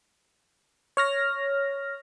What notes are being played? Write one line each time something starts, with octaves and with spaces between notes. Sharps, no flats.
C#5 F6 A#6